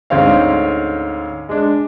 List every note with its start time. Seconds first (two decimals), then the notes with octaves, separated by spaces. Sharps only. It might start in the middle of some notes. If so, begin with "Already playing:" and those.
0.10 D2 G#2 C4 C#4 F5
1.49 G#3 D4